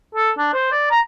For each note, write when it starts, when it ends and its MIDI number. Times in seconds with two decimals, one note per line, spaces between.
0.15 0.31 69
0.38 0.50 62
0.53 0.70 72
0.72 0.88 74
0.91 1.00 82